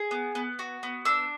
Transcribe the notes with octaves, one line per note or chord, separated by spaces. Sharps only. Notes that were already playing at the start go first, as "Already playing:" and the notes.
Already playing: G#4
B3
B3
F#4
B3
D4 E6